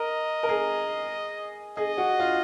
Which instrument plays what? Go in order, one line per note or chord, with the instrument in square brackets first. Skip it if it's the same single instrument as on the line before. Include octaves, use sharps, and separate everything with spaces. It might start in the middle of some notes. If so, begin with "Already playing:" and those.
Already playing: [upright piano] A#4 [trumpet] D#5
[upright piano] A#4
G#4
[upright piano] G#4 [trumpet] D#5
[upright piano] F#4
F4